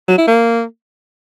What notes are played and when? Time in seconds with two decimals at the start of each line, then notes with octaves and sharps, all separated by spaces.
0.08 F#3
0.18 E4
0.28 A#3